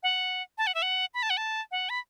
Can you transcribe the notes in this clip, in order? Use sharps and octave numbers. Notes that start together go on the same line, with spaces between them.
F#5
A5
F#5
E5
F#5
B5
A5
F#5
A5
F#5
B5